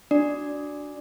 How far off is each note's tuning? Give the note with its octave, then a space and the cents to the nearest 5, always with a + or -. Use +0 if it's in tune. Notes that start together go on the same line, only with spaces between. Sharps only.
D4 -5 F#4 +0 D5 +0